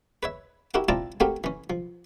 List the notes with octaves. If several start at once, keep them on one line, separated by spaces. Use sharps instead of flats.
B4 C#5 E5
E4 F#4 G4 A#4 F#5
C4 E4 F4 D5 A5 A#5
A3 C4 F#4 G4 A#4 F5
E3 C#4
F3